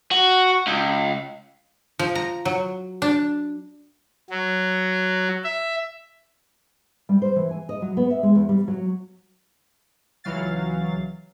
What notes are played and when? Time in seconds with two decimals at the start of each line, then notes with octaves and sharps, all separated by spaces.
0.11 F#4
0.67 C#2
1.99 F3
2.15 A#5
2.45 F#3
3.02 D4
4.30 F#3
5.44 E5
7.09 G3
7.22 C5
7.36 E3
7.51 G#5
7.69 D#5
7.82 F#3
7.97 B3
8.10 E5
8.23 G#3
8.35 E2
8.49 G3
8.68 F#3
10.24 C#2 E3 F#3 F5 A6